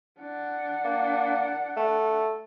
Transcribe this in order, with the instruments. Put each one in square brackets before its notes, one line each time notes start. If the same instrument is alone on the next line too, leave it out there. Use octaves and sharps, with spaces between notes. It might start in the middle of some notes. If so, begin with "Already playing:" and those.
[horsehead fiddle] D4 F#5
[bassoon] A#3
A3